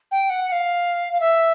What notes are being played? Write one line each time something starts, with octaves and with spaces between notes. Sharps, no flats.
G5
F#5
F#5
F5
F5
E5